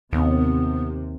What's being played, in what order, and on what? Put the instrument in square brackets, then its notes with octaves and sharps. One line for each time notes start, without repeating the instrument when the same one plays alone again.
[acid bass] D#2 [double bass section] C3 [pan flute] B3